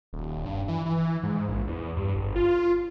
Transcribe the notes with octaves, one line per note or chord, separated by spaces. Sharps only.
D#1
G2
E3
E3
G#2
A#1
E2
G2
G1
F4